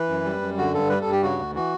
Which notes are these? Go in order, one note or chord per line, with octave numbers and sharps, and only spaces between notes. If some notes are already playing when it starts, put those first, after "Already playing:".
Already playing: E3 B4
F#2
G3
F#2
D3 F#4
G2 A4
G3 B4
A4
G2
G4
C#3 F#4
D2
E3 F#4